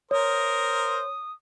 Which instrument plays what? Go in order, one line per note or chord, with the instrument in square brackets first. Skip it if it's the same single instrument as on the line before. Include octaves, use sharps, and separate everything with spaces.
[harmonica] A#4 C5 [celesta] C#5 [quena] D#6